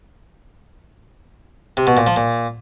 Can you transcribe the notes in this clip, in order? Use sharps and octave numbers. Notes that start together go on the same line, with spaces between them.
C3
B2
A#2
F3
A#2